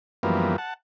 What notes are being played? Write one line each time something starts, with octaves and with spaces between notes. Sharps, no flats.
F#2 E3 F3 G3 A#3 B3
F#5 A5